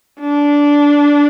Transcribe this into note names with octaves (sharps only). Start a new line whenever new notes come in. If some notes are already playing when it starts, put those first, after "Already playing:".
D4